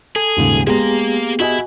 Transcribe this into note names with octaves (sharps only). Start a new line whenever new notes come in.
G#4 A4
D#1 G#2 C#3
G#3 A#3 B3 G4 G#4 A#5
E4 F#4 D#5 G#5